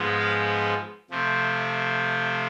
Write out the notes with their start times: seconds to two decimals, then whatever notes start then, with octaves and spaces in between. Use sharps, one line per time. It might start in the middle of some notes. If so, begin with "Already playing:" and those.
Already playing: G#2 F3 G#3 B3
0.19 F5
1.10 C3 F3 A3 C4